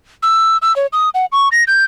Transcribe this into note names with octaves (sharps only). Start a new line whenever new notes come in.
E6
E6
C#5
D#6
F#5
C#6
A#6
G6